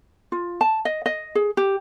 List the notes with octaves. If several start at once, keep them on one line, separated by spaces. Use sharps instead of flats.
F4
A5
D#5
D#5
G#4
G4